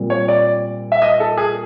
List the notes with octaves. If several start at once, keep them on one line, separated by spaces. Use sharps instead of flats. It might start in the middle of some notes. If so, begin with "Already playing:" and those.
Already playing: A#2 G3 C4 F4
C#5
D5
E5
D#5
A4
G#4